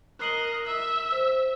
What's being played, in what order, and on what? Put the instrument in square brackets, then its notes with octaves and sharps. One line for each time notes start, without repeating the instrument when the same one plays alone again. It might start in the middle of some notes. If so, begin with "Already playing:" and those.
[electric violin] A#4 D#5 [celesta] F#6 C7 F#7
[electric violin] E5
[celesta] C5